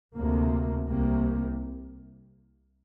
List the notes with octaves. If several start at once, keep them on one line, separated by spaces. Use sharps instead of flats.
D2 C3 A#3
C2 C3 A#3